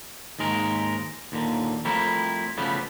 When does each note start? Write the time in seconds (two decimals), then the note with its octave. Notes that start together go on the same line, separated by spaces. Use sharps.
0.39 D#2 G#2 G#3 A#4
1.32 D#2 A#2 D3
1.85 F3 G3 A3 C4 E4 A#4
2.57 C#3 F3 G3 A3 B3